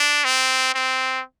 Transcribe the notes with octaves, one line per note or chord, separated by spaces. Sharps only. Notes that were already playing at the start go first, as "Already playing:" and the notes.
Already playing: D4
C4
C4